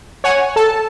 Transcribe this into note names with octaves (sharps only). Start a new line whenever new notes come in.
C#5 F#5 G#5
A4 A5